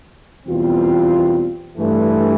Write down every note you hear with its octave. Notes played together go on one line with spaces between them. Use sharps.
E2 B2 G3 C4 F4
G2 E3 A3